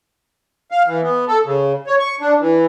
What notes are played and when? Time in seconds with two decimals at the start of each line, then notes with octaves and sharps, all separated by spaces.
0.71 F5
0.86 E3
1.03 B3
1.28 A4
1.45 C#3
1.87 C#5
2.00 C#6
2.21 D4
2.40 E3